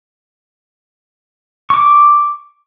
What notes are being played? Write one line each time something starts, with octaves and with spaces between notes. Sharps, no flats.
C#6 D6